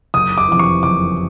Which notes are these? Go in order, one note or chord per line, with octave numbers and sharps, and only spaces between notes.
F#1 D#6
D6
F2 C3 E3 D6
C#6
F#1 D6